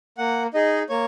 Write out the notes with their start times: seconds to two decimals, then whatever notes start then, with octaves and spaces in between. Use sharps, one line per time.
0.18 A#3 F#5
0.54 D#4 G#4 D#5
0.89 A#3 C#5